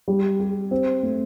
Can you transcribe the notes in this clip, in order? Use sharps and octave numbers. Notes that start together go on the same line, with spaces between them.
G3
G4
C4
A3